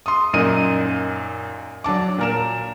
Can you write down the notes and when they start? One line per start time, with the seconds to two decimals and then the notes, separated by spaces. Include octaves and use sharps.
0.06 C6 D#6
0.33 F#2 A#2 D#4 D#7
1.84 F#3 D4 A5 D6
2.19 A#2 A#4 E7